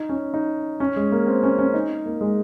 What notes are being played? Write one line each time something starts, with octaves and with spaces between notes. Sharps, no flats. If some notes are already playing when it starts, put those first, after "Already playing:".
Already playing: D#4
C#4
D#4
C#4
G#3
A#3
C4
C#4
C#4
D#4
A#3
G#3